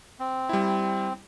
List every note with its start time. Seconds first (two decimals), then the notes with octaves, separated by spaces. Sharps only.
0.19 C4
0.49 G3 E4